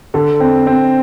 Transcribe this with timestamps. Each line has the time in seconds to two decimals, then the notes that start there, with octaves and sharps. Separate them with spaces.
0.14 D3 A4
0.40 C4
0.67 C4